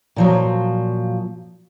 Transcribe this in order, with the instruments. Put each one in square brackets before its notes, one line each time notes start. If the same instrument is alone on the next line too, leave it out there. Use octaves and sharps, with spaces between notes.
[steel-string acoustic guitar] A#2 F3 F#3